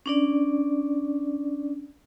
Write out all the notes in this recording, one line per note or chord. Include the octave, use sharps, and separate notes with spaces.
C#4 D4 D5